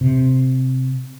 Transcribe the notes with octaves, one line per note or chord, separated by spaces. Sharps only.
C3